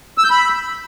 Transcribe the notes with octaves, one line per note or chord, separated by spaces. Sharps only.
E6
G6
B5